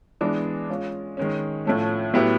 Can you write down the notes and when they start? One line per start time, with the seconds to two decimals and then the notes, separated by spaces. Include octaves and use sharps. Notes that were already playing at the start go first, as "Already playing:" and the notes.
0.21 E3 G#3 B3 D4
0.69 G#3 C#4 F4
1.17 D#3 G#3 C#4
1.66 A2 F3 A3 C#4
2.14 A2 F#3 B3 E4 G4